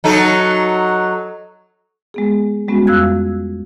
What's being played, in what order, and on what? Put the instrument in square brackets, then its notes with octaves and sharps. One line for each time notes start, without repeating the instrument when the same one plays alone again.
[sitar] F#3 D#4 A4
[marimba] G#3 B3 G#4
G3 G#3 B3 C#4 F#4
F2 G#3 F5 E6 F#6 G#6